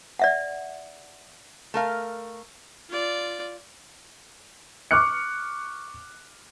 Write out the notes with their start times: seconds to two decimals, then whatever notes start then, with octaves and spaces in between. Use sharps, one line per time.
0.19 D5 E5 F#5
1.74 A3 A#4 F5
2.89 F4 D5
4.91 C#6 D6 F6 F#6 C#7